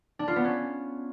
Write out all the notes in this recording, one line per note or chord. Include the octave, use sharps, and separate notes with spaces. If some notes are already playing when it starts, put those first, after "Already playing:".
D4
F4
B3
C#4